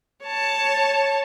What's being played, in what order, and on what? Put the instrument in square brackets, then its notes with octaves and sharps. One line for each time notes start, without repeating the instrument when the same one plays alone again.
[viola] C#5 A5